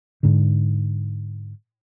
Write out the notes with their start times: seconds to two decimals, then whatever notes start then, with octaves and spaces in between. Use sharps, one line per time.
0.23 G#2 D3